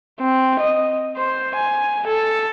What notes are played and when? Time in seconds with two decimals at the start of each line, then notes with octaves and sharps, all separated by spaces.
0.20 C4
0.60 D#5
1.17 C5
1.56 G#5
2.07 A4